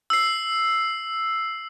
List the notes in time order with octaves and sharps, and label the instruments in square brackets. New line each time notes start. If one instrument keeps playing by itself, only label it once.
[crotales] E6 C7